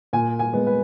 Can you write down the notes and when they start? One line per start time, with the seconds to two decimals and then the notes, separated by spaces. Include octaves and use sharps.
0.13 A#2 G#5
0.39 G#5
0.53 G#3 B3
0.67 B4